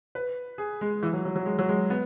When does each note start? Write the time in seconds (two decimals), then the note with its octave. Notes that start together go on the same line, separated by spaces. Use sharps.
0.15 B4
0.58 G#4
0.81 G#3
1.03 E3
1.13 F#3
1.25 F#3
1.36 F#3
1.46 G#3
1.59 F#3
1.69 G#3
1.90 B3